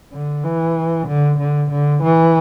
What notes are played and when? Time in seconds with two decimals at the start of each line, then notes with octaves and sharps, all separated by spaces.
0.13 D3
0.44 E3
1.08 D3
1.39 D3
1.71 D3
2.03 E3